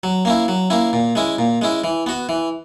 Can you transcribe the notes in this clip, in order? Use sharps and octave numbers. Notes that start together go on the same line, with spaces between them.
F#3
A#3 C#4 E4
F#3
A#3 C#4 E4
A#2
G#3 C#4 E4
A#2
G#3 C#4 E4
E3
B3 F#4
E3